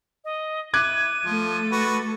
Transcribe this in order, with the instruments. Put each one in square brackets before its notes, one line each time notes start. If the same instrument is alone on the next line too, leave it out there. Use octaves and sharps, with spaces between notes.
[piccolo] D#5
[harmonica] E4 [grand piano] D6 F#6 G#6 [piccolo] D#7
[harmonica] F3 [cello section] A3 A4
[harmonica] F#4 B4